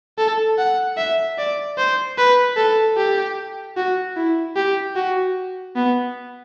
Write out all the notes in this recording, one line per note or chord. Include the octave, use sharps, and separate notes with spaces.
A4
F#5
E5
D5
C5
B4
A4
G4
F#4
E4
G4
F#4
B3